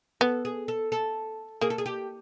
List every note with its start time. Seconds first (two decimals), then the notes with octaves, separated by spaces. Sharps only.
0.21 B3 A4
0.45 G#4
0.68 A4
0.92 A4
1.61 A#3 G#4
1.70 A4
1.78 G#4
1.86 G4